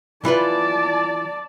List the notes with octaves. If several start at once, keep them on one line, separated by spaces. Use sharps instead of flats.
E3 F4 B4 D5 A5